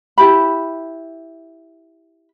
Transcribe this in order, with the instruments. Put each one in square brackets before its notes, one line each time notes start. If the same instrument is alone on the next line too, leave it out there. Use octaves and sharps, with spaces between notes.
[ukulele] E4 G4 B5